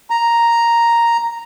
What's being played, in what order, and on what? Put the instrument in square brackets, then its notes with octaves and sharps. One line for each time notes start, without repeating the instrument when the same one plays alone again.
[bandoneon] A#5